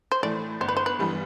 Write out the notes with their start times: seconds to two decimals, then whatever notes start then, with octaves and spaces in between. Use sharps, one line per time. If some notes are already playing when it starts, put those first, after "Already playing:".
0.12 C5
0.23 A2 E3 A3 D5
0.61 G1 C5
0.69 B4
0.77 C5
0.86 B4
0.99 G2 E3 G3 B3